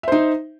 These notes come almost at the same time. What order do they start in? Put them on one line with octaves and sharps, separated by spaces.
E5 C5 D#4